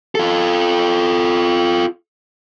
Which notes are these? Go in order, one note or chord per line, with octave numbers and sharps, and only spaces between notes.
F4 A4